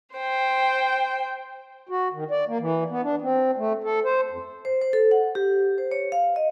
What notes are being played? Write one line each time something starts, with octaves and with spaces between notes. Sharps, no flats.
C5 G5
F#4
D#3
D5
A#3
E3
B3
D4
C4
A3
A4
C5
F2
C5
C5
A4
F#5
G4
C5
C#5
F5
D#5